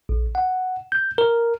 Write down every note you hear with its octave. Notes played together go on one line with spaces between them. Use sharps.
A#1
F#5
G6
A#4